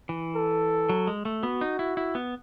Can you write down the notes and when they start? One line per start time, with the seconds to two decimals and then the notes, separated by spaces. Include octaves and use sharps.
0.09 E3
0.35 A4
0.89 F#3
1.07 G#3
1.25 A3
1.43 B3 F#4
1.61 D#4
1.79 E4
1.97 E4
2.15 B3